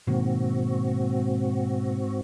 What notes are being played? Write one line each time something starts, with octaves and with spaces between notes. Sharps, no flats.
G#2 B2 D#3 A#3 C4 F#4